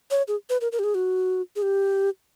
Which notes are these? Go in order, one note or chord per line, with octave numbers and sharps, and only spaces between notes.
C#5
G#4
B4
A#4
A#4
G4
G#4
F#4
G#4
G4